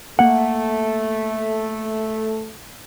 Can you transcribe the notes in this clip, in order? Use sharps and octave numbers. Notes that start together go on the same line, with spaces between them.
A3 A#3 F#5